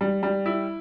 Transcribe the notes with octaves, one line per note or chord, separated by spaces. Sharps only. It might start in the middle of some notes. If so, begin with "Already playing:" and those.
G3
G3
E4